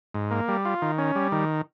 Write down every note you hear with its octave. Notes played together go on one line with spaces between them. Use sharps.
G#2
A#3
G3
F4
D#3
C#4
G3
D#3